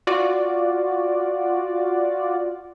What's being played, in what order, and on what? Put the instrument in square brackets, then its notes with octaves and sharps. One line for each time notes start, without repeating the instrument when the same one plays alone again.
[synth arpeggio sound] F4 F#4 D5